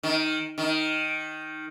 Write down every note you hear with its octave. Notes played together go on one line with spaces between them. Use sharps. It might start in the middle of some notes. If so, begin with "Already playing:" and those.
D#3
D#3